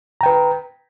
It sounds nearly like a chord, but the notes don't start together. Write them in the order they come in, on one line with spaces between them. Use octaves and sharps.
A#5 G5 B4